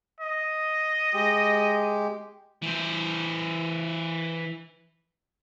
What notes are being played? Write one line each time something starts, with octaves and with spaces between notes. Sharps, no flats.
D#5
G#3 G4
E3 C5